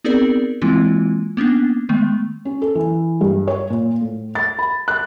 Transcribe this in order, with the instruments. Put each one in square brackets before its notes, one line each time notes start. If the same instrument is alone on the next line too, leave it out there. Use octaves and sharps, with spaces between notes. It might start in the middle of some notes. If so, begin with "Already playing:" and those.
[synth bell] B3 C4 D#4 G#4 A#4 D5
E3 G#3 A#3 C4 E4 F4
A#3 B3 C#4 D4
D#3 G#3 A3 B3
[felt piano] C#4
A4
E3
G2
C#5
A#2
A2
A6
B5
F#6